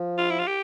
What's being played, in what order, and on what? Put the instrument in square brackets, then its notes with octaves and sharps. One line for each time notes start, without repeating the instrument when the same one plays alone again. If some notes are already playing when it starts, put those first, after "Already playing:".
Already playing: [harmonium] F3
[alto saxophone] F4
E4
F4
G4